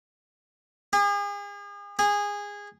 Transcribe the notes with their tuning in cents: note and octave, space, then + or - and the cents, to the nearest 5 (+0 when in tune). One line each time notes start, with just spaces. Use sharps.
G#4 -40
G#4 -20